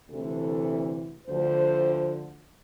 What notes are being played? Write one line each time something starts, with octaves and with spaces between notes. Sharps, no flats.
D2 C3 E3 A4
D2 D3 F3 C5